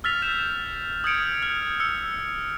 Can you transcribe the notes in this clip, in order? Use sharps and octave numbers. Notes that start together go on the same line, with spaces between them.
E6 F6 A6 B6 F7
G6 E7
D#6 G6 G#6 C#7 D7 F7
F6
E6 C#7